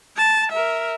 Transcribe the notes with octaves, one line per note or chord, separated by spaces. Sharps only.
A5
A#4 E5